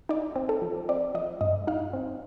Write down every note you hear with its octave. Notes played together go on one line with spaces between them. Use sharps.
D#4 D5
C4
A4
F3
C4 D5
F3 D#5
G2 D#5
D#4 F5
C4